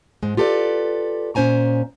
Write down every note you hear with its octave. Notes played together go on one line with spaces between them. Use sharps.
G#2 G#3
F4 G4 A4 B4 D5
A#2 C#4 C5 G#5 A#5